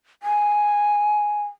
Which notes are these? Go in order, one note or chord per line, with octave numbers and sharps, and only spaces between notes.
G#5